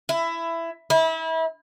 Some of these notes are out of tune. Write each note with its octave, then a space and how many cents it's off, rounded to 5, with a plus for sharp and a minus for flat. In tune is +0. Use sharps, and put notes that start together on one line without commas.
E4 +15
E4 -30